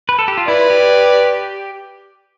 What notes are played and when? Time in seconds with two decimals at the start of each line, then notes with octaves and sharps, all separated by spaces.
0.09 B4
0.19 A4
0.28 G4
0.38 F4
0.48 E4 B4 D5
0.70 G4